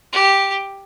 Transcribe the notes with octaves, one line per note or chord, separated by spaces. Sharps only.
G4